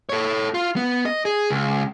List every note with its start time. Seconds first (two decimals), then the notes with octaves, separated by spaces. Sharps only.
0.09 A4 C#5
0.54 F4
0.76 B3
1.06 D#5
1.25 G#4
1.50 C#2